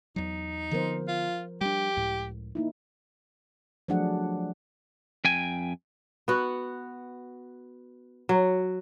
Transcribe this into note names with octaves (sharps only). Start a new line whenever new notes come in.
E2 F#3 D#4
D3 F3 B3 A#4 C5
F4
G3 D4 G4
C#2 A2
A#3 D#4 E4
F3 F#3 A3 D4 G#4 F#5
F2 G5 G#5
B3 F#4
F#3